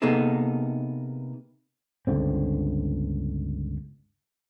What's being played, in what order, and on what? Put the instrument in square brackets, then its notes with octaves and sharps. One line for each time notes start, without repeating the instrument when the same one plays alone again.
[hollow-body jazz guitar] C3 A#3 B3 D#4 G#4 A4
[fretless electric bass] G1 C#2 D3 C4